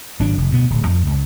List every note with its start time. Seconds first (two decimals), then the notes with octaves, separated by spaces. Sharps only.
0.20 G#1 F#3 D4
0.38 F1
0.51 D2 B2 B3
0.70 D1
0.87 F2
1.06 C#2